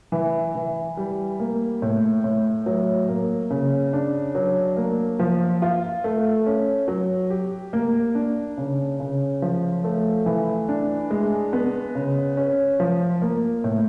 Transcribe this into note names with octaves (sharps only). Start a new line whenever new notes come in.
E3
E3
G3
A#3
A2
A2
F#3
A#3
C#3
D4
F#3
A#3
F3
F4
A3
C#4
F#3
G4
A#3
D4
C#3
C#3
F3
A3
E3
D4
G#3
B3
C#3
C#4
F3
A#3
A2